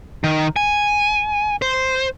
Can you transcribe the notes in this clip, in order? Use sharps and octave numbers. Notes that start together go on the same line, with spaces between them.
D#3
G#5
C5